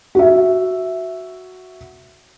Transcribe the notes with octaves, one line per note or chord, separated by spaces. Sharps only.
F#4 E5